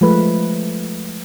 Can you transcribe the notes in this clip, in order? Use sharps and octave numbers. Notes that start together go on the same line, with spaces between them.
F3 G#3 A3 B4